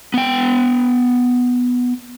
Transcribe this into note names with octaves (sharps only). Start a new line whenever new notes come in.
B3 G5